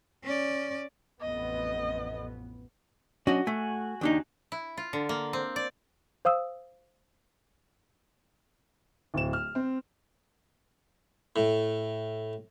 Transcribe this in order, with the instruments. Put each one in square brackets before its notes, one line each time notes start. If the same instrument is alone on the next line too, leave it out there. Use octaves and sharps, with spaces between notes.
[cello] C#4 D5
[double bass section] A1 F2 B3 [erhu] D#5
[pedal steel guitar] F#3 C#4 D4 [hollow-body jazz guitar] F#4 D#5
[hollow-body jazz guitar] A3 [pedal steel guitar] F#4 F#5 G#5
[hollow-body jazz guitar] D#2 D4 D#4
[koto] E4
F4
D3
A#3
C4
D5
[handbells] C5 F5 D#6 E6
[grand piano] D1 E7
F6
C4
[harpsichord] A2